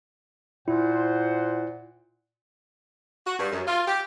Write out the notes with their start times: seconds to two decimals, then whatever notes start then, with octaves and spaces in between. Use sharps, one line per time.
0.68 A#2 E4 C5 F#5
3.26 F#4
3.39 G2
3.52 F#2
3.67 F4
3.87 G4